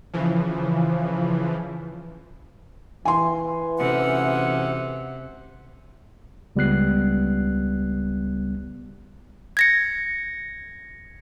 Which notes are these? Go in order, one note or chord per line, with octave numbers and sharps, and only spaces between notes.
C#3 E3 F3
E3 G#5 C6
D2 C3 C#4 F#5
C#2 G3 B3 F#6 C7
G#6 A#6 C#7